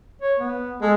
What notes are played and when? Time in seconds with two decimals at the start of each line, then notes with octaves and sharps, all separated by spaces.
0.22 C#5
0.39 B3
0.82 G#3 A4